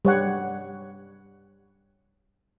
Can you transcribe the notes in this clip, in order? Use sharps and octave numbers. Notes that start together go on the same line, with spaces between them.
G3 C#5 F#5